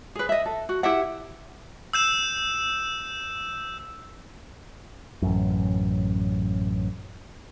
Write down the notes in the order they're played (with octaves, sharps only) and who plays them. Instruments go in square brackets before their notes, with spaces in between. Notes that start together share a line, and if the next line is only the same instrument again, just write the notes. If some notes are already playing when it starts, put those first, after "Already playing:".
[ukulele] G#4 B4
D#5 E5
A4
F#4
E4 G4 E5 F#5
[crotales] E6 G6 E7
[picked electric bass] A1 F#2